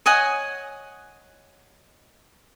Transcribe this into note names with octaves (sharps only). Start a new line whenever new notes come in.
C#5 D#5 F#5 G#5